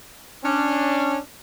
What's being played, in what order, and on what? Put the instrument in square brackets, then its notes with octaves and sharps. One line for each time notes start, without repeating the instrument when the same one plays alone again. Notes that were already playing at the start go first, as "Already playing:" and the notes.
[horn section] C#4 D4